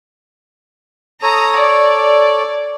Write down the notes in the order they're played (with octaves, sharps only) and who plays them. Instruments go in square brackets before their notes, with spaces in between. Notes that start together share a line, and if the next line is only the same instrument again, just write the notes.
[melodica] A4 C#5 [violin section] A#5 D#6
[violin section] D5